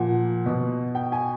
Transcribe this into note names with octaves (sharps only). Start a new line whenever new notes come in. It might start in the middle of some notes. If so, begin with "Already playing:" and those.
Already playing: A#2 F3 F#5
B2
G5
G#5